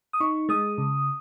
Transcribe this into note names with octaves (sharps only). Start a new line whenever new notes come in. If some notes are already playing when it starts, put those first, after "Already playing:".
D#6
D#4 C#6
G#3 D#6
C#3